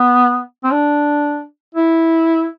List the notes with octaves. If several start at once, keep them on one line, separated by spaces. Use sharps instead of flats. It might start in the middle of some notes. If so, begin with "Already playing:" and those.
Already playing: B3
C4
D4
E4